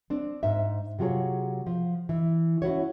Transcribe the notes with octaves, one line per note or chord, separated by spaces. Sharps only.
C4 D4
G#2 C5 E5
C3 F#3 F4 G#4 C#5
F3
E3
C#4 E4 F#4 C#5